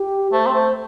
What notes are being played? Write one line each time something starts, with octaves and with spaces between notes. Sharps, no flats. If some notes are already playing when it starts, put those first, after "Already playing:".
Already playing: G4
A3 C5
C4
A3 C5